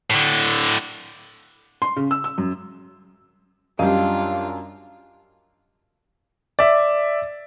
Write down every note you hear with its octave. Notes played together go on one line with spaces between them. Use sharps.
A2 D3
C6
C#3
E6
E6
F#2
F#2 G3 D4 F4 G4 D#5 F5
D5 E5